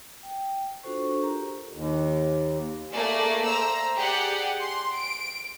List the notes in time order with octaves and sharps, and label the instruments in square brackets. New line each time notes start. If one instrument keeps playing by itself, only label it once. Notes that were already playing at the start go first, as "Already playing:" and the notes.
[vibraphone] G5
D4 F4 F#4 A4 C5 C#6
G4 A#4 A#5
[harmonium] D#2
[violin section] A3 A#3 G#4 D5
C5 A#5 E6
G4 G#4 D5 F#5
C6
D7